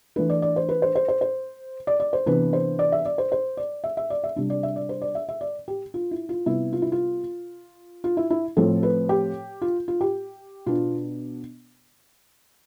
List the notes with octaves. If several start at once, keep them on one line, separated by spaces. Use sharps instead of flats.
E3 A3 D4 B4
D5
D5
C5
B4
C5
C5
C5
C5
D5
D5
C5
C3 E3 B3 D4 B4
C5
D5
E5
D5
C5
C5
D5
E5
E5
D5
E5
C3 G3 D4
D5
E5
D5
C5
D5
E5
E5
D5
G4
F4
E4
F4
C3 G3 B3 E4
F4
E4
F4
F4
E4
E4
A2 F3 C4 A4
B4
G4
F4
F4
G4
B2 B3 D4 F4